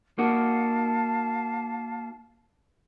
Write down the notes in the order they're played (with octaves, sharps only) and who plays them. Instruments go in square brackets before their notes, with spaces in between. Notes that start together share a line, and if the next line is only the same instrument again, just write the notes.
[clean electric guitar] A#3 D#4 F#4 [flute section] F5 A5